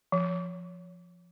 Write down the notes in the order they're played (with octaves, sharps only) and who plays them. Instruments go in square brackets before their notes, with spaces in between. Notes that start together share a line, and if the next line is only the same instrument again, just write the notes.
[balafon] F3